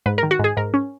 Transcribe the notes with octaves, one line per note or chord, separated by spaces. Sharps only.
G#2 B4
A#4
D#3
F#4
G#2 G#4
G#2 A#4
C#4